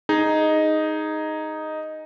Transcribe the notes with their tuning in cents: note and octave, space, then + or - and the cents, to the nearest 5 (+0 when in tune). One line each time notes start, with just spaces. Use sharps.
D#4 +0 G#4 +0 D#5 +0